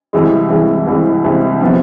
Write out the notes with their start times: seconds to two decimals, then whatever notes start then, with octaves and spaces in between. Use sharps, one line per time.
0.13 C2 C3 E3 G#3
0.50 C2 C3 E3 G#3
0.87 C2 C3 E3 G#3
1.24 C2 C3 E3 G#3
1.61 C3 F3 B3